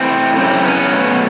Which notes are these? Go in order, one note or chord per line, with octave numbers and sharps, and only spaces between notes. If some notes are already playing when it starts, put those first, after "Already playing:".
Already playing: C3 E3 A3 C4
F#2 C#3 E3 A3 C4
B3 C#4
B2 F#3 A3